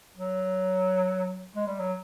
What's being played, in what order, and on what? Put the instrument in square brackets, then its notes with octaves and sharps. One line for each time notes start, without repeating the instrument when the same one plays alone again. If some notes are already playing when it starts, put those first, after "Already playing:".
[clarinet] F#3
G#3
G3
F#3